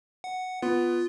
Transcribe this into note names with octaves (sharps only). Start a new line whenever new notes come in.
F#5
B3 F4